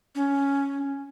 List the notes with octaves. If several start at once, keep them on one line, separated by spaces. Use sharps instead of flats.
C#4